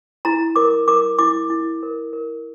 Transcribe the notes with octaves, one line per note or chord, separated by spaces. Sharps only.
E4 A#5
A#4 D6
A#4 D6
E4 D6
E4
A#4
A#4